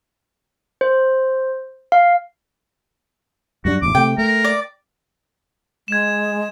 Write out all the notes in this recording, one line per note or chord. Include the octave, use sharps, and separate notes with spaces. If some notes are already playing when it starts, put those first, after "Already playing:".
C5
F5
F#2 G3 D4 F#4
A1 E2 D6
C3 A3 G5
A3 A#4
D5
G#3 G#6 E7